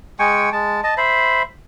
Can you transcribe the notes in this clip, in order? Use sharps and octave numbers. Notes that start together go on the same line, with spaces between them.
G#3 G5 G#5 C#6
G#3 A5
D#5 A5
C5 E5 B5